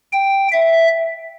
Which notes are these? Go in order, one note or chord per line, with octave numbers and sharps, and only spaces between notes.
G5
E5